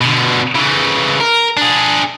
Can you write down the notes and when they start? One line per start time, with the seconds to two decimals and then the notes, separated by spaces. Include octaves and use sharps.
0.01 B2 D3
0.55 C#3 E3
1.20 A#4
1.57 D4 G#4